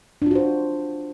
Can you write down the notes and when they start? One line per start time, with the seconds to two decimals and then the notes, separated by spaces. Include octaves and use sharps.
0.22 D4
0.26 F4
0.31 F#4
0.35 C5